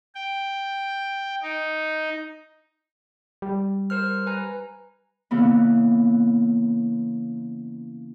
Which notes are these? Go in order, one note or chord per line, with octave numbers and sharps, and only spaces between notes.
G5
D#4
G3
A#4 C5 F6
B4 G#5 A#5
C#3 E3 A#3 B3